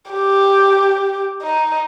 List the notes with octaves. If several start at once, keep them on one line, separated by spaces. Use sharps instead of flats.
G4
D#4